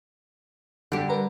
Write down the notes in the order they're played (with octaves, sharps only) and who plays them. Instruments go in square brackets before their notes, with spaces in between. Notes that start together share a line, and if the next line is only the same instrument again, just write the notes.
[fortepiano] D3 [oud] G3 G4
[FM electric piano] A#4 B4 A#5